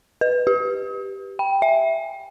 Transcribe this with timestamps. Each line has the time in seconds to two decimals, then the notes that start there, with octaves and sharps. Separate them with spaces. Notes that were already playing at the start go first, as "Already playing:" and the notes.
0.21 B4
0.47 G4
1.39 G5
1.62 E5